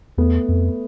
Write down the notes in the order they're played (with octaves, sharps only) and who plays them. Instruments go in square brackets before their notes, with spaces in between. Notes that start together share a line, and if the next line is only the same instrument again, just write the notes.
[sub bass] E2 [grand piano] A3 B3
[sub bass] F2